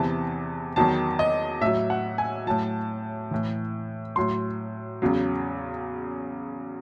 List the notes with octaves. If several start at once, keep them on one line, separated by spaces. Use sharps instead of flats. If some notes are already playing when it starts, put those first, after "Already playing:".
Already playing: E2 C3 E3 A5
E2 D#3 F#3 A5
D#5
A2 F#3 E5
F#5
G#5
A2 F#3 A5
A2 E3
A2 F#3 C6
E2 C#3 F#3